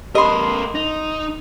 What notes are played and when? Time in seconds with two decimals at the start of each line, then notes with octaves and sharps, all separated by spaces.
0.15 B3 G4 A#4 D#5 B5 C6
0.75 D#4 A#6